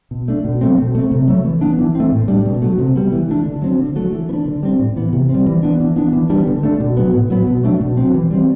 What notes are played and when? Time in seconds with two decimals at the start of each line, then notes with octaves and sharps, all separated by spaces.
0.11 B2
0.28 A3 D4
0.45 B2
0.61 F#3 A3 C4
0.78 B2
0.95 A3 C4
1.11 C3
1.28 F#3 A3
1.45 E3
1.61 B3 D4
1.79 E3
1.95 A3 C4
2.12 A2
2.28 G3 D4
2.45 B2
2.62 F#3 A3
2.79 C3
2.96 G3 B3
3.12 E3
3.29 A3 D4
3.46 D3
3.62 F#3 C4
3.79 D3
3.96 F#3 A3
4.13 E3
4.29 B3
4.33 D4
4.46 D3
4.63 G3 C4
4.79 A2
4.96 E3 B3
5.13 C3
5.29 G3 C4
5.46 E3
5.63 B3 D4
5.80 E3
5.96 B3 D4
6.13 E3
6.30 G3 B3 D4
6.47 D3
6.63 A3 D4
6.80 B2
6.97 F#3 B3
7.13 A2
7.30 F#3 B3
7.47 B2
7.63 F#3 A3 D4
7.81 B2
7.97 F#3 C4
8.14 E3
8.31 G3 C4